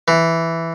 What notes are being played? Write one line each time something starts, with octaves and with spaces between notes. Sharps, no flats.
E3